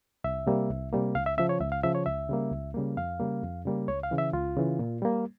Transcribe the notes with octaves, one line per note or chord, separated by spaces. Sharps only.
C2 E5
C3 G3 A#3
C2
C3 G3 A#3
C#2 F5
E5
C#3 F3 E5
C#5
C#2 E5
F5
C#3 F3 E5
C#5
C#2 E5
C#3 G3 A#3
C#2
C#3 G3 A#3
F2 F5
C#3 G3 A#3
F2
C#3 G3 A#3
C#2 C#5
F5
C#3 E3
E5
C#2 F4
C#3 E3
A#2
G3 A#3